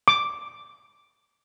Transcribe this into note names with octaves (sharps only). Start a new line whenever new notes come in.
D6